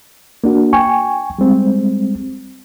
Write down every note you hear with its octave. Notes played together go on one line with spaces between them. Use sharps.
A#3 D4 F#4
G5 G#5 C#6
G3 G#3 C4